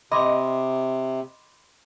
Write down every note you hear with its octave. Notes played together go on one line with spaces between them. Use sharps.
C3 D#5 B5 C6 D6